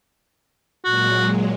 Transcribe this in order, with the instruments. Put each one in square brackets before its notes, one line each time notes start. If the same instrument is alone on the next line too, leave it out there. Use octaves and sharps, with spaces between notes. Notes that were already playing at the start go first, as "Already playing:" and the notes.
[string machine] A#2 F#3 G#3 [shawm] F#4